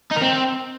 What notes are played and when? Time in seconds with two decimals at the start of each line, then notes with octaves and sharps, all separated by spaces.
0.11 D#4
0.16 A#4
0.22 C4